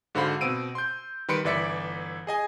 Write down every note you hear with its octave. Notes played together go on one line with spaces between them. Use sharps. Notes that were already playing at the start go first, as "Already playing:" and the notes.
G#2 D3 F#4 C5 F5 B5
B2 C4 E6 D7 D#7
C6 G6
D#3 G3 B4 C6 C#7 D7
G1 E3 D5 E5 B6 C#7
G#4 D#5 G#5